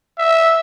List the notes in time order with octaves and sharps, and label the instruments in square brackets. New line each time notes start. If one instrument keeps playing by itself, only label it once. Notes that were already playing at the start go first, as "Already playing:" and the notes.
[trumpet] E5